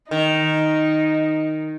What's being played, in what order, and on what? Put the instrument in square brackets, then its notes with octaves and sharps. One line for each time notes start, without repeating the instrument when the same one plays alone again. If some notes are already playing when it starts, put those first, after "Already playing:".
[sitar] D#3 [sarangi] D#4